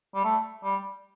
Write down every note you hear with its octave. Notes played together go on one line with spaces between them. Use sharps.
G3
A3
G3